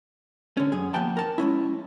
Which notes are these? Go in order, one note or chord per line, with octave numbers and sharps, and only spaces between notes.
D3 C#4
F#2 G#4
F3 A#3 B3 B4 G5 A5
A#4 A5
G#3 A#3 C#4 E4